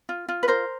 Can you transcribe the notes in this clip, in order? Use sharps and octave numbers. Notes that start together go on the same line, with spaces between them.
F4
F4
B4
A#4 C5